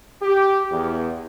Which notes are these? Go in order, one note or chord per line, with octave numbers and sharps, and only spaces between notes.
G4
E2